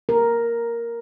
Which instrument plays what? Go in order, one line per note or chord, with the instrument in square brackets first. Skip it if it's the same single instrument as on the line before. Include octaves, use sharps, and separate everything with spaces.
[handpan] A#4